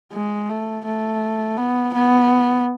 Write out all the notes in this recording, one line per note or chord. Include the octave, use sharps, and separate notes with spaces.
G#3
A3
A3
B3
B3